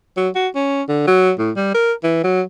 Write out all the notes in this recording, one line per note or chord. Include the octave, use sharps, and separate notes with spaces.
F#3
F#4
C#4
D3
F#3
A2
G3
A#4
E3
F#3